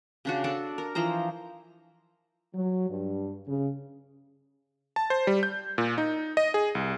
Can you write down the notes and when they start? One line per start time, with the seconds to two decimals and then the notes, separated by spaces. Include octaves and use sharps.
0.25 C#3 D4 F#4
0.44 D4 A4 D5 A5
0.78 A#4
0.95 E3 F3 C5 A#5
2.55 F#3
2.90 G2
3.48 C#3
4.96 A5
5.10 C5
5.27 G3
5.43 G6
5.78 A#2
5.98 D#4
6.37 D#5
6.54 G#4
6.75 C2